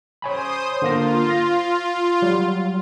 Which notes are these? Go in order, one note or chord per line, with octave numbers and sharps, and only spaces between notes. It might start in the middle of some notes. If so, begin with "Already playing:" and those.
C5 C#5 G#5 B5 D#6
D3 A#3 F4 A#6
A#6
F#3 G3